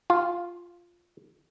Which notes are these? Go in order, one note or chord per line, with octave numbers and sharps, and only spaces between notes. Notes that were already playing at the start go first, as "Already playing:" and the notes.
F4